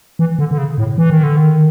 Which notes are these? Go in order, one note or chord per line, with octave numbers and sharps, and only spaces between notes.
E3
D3
D3
C#3
A2
E3
D#3
D3
D#3